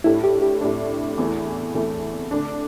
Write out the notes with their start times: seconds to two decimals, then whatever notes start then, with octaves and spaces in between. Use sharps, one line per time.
0.04 A2 G3 D4 E4
0.24 G4
0.42 G4
0.61 A2 G3 D4
1.18 E2 E3 A3 E4
1.74 E2 E3 A3 E4
2.31 D3 A3 D4